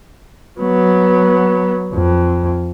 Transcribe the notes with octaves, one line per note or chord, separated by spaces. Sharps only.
F#3 B3
F2